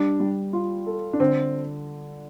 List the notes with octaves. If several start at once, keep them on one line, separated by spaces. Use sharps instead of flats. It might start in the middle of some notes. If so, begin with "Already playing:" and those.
Already playing: G3 D4
G3
F4
A4
D4
D3 C4